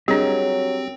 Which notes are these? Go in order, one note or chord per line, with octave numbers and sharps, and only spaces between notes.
F#3 G3 C4 D4 G4 G#4 A#4